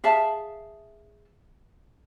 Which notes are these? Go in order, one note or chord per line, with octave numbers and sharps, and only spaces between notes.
G#4 E5 F5 A5